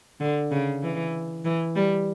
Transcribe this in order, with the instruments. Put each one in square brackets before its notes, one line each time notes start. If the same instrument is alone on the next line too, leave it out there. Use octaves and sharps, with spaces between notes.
[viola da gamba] D3
C#3
E3
E3
G3